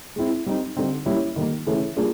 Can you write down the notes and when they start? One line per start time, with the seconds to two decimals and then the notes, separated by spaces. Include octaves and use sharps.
0.16 G#3 C4 E4
0.46 G3 C4 D#4
0.76 D3 G3 C4 D#4
1.06 G3 A#3 C#4 E4
1.36 D#3 G3 A#3
1.66 C#3 E3 A3 C#4 E4
1.96 G3 A#3 D4 F4 G#4